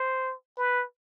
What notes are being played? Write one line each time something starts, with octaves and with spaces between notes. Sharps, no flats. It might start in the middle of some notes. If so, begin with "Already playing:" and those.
Already playing: C5
B4